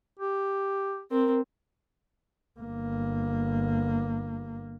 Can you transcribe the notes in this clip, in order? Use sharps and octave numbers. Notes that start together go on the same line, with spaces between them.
G4
C4 A#4
G1 A#3